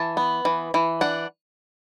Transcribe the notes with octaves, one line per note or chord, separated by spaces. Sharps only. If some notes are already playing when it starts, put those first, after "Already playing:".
Already playing: E3 A5
B3
E3
E3
D4 F#5